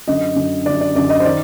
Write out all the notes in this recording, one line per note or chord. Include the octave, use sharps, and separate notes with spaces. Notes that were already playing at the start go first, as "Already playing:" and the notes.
F#2 D3 D#5
F#2 D3
F#2 D3 D5
D5
F#2 D3 D5
D#5
C5
D#3 D5